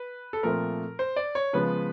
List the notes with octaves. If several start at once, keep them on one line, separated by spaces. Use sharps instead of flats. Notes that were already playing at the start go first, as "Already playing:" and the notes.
Already playing: B4
A4
A#2 F3 A3 C4 A#4
C5
D5
C#5
C#3 F3 G#3 B3 B4